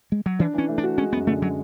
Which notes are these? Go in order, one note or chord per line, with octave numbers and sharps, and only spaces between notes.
G#3
F#3
E3 D4
E3 C#4
A3
D4
F#4
G#3 C#4
F#2 B3
D3 A3
F#3